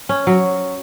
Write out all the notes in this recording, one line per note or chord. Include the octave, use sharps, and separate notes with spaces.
C#4
F#3